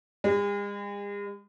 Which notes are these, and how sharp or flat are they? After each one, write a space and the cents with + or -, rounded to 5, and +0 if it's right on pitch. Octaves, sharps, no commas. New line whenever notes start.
G#3 -45